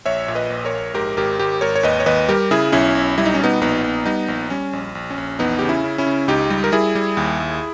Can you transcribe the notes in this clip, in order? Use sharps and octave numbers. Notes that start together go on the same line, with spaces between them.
A#1 C#5 E5
A#2
B4 D#5
A#1
A#4 C#5
A#1
G#2 G4 A#4
G#1 G4 A#4
G#1 G4 A#4
G#1 A#4 C#5
C#5
D#2 B4 D#5
C#5
D#2 B4 D#5
G3 G4 A#4
C#3 E4 G#4
B1 C#4 E4
B1
G3 E4
D#4
C#4
B2 B3 D#4
A#1 B3 D#4
A#1
G3 B3 D#4
A#1
G3 C#4
A#1
A#1
C#4
A#1
E2 B3 D#4
C#3 G4
C#4 E4
C#3
C#4 E4
C#3
C#2 D#4 G4
G3
A#4
G3 E4 G#4
G3
D#2
D#2